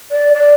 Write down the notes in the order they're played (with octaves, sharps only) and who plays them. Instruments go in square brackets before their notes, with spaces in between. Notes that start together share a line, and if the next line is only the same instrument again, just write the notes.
[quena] D5
D5